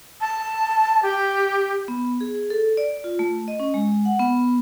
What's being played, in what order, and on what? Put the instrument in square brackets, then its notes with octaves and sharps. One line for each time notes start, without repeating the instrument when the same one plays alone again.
[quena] A5
G4
[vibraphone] B3
G#4
A4
D5
F4
A3
D#5
C#4
G#3
F#5
B3